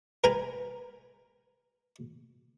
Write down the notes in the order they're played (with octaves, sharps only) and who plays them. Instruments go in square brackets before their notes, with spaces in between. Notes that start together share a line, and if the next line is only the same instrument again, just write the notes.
[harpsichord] A#4 B4 G5 G#5 A#5 B5